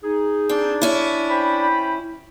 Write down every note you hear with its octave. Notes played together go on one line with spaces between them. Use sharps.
D#4 G#4
C4 D4
C#4 E4
C5 G5 B5